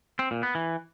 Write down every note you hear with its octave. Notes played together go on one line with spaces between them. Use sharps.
C4
A#2
B3
E3